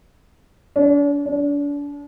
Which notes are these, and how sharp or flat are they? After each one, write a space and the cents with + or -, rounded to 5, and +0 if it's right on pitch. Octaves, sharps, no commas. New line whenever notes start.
D4 -40
D4 -35